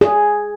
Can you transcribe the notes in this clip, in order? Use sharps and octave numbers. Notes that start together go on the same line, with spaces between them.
G#4